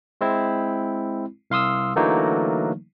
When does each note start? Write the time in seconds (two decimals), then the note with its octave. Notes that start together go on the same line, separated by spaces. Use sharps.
0.21 G#3 C4 E4
1.50 C2 F5 C6 D#6 E6
1.96 D3 E3 F#3 A3 A#3 D#4